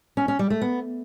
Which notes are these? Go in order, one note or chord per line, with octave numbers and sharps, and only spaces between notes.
C#4
C#4
G3
A3
B3